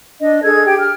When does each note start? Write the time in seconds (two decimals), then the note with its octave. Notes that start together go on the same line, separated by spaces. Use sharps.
0.20 D4 D#5
0.43 D4 G#4 A4 G#6
0.65 G4 G5
0.77 F6